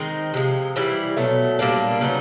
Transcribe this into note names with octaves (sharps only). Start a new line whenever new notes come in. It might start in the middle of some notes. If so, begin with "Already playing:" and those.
Already playing: D#3 G#3 C4 D#4
C3 F3 G#3
E3 G3 C4 E4
B2 F#3 A3
A#2 G3 A#3 D4
C#3 F#3 B3 D#4